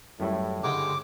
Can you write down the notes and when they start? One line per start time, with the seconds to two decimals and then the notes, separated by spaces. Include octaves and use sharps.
0.20 F#2 A2 G3 E4
0.64 G2 D3 G#3 D#4 D6